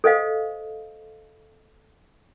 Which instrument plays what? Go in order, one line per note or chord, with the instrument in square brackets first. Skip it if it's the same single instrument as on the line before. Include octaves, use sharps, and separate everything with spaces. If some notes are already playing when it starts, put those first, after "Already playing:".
[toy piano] A4 C5 D#5 F5